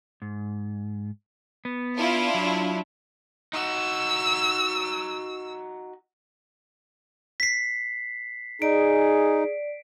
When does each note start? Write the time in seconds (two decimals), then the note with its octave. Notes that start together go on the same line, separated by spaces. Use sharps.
0.22 G#2
1.65 B3
1.97 D4 E4 F4
2.34 F#3
3.53 D#4 F#4 E6
7.40 B6 C7
8.62 D#4 G#4 D5 D7